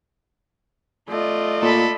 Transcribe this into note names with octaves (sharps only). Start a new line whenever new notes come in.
A3 F4 D5 D#5
A#2 A4 B5